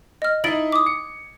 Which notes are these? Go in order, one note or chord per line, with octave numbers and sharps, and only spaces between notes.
D#5 F6
D#4 E4 D#5 A6 D7 F#7
D6 D#6
C#7